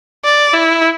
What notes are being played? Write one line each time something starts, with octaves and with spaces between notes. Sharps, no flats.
D5
E4